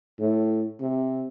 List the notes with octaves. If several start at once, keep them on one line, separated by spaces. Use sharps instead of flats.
A2
C3